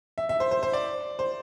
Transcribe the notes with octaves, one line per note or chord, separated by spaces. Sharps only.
E5
E5
C5
C5
C5
D5
C5